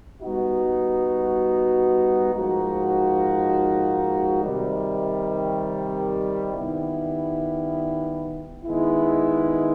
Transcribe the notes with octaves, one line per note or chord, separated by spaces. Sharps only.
G3 B3 D#4 F#4
G#2 F3 A#3 D#4 F#4
C3 D#3 G3
D#3 G3 B3 E4
D#3 G#3 B3 E4